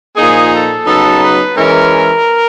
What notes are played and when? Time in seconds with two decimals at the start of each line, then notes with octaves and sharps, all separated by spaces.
0.16 A#2 F3 A#3 D#4 G#4
0.51 A4
0.85 C#3 F#3 B3 D#4 A4
1.21 B4
1.55 E3 G#3 C#4 E4 A#4